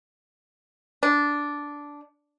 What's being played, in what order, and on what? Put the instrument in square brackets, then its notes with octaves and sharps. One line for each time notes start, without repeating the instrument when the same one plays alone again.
[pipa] D4